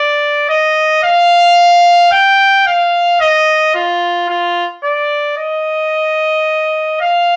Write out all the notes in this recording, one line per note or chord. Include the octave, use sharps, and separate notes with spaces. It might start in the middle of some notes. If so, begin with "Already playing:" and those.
Already playing: D5
D#5
F5
G5
F5
D#5
F4
F4
D5
D#5
F5